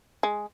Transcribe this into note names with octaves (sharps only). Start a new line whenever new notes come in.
G#3